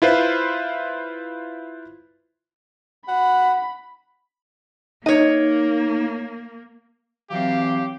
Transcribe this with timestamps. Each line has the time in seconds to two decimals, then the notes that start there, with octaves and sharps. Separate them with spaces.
0.02 E4 F4 B4 C5
3.08 F#4 B5
5.06 A#3 D#4 C#5 D#5
7.30 E3 F#3 C4 G4 F5 D6